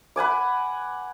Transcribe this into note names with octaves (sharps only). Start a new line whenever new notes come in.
B4 F#5 G#5 D6